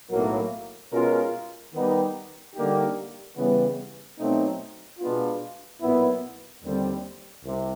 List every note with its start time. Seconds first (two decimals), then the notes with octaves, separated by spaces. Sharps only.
0.11 B1 A2 F#3 A#3
0.92 B2 G#3 C#4 F4 A#4
1.74 D#3 G3 B3 D#4 G4
2.55 D3 G3 A#3 D#4 G4
3.37 C#3 E3 G3 B3
4.19 B2 F#3 A3 C4 D#4
5.00 B2 G#3 B3 D4 F4
5.81 B1 A#2 F#3 B3 E4
6.63 D#2 D3 G3 C4
7.44 C2 C3